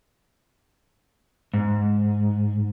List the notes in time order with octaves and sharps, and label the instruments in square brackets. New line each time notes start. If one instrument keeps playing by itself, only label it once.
[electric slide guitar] G#2